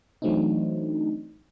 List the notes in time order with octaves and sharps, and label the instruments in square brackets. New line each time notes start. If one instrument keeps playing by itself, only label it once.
[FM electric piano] E3 F#3 A3 C4 D4 D#4